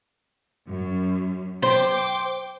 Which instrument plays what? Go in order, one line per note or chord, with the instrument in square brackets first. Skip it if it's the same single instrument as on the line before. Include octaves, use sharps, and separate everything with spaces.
[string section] F#2
[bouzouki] C5 [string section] G5 D6